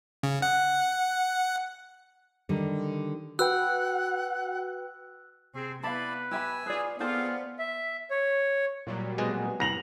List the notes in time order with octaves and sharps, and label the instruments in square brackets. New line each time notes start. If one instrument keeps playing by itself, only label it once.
[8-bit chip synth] C#3
F#5
[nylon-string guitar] D3 D#3 G3
[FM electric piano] F#4 B4 G5 [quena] F#5 [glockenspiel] E6 F#6
[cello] C3 G#4 [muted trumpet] C4
[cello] B3 [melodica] E4 D5 B5 [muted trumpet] B4 [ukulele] F5 A5
[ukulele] G4 E5 B5 [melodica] G#5 E6
[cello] F4 [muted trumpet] G#4 [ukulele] B4 D5
[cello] B3 [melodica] C4 G#4 F5 [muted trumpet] F4 [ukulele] A4 C5 D5
[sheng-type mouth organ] E5
C#5
[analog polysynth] A#2 F#3 G3
[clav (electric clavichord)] B2 G#4 D#5 [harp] G#3 B3 C4
[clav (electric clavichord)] C2 [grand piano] A#6 F7 F#7